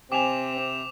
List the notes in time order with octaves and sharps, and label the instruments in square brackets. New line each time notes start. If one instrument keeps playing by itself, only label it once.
[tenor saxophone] C3 [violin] C4 [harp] G5 G#5 [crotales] D6 E7 F7